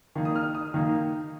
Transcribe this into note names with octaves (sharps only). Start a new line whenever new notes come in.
D#3 A#3 D#4
D#6
F6
D#6
D#3 A#3 D#4